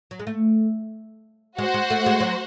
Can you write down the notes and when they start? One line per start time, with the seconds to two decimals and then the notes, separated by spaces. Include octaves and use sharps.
0.11 F#3
0.19 G#3
0.27 A3
1.58 G#3 F#4 C5 F#5
1.74 G#3
1.90 A3
2.06 G#3
2.20 F#3